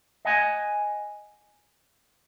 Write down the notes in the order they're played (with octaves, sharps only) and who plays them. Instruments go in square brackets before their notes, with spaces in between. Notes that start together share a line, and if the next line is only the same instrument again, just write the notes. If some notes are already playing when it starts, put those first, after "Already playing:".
[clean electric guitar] D#5 F#5 G#5